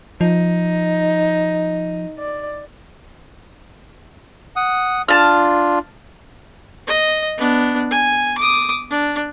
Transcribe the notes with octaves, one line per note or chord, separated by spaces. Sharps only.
F3 D#4
D5
F#5 D#6
D4 F4 A5 F6
D#5
B3 D4
G#5
D6 D#6
D4